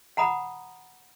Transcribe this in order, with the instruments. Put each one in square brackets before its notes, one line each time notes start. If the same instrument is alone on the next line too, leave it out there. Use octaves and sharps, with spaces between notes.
[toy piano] F#5 A#5 B5 D#6